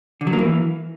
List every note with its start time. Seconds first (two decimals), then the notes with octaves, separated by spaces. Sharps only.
0.21 D3
0.27 F#3
0.33 A#3
0.39 E3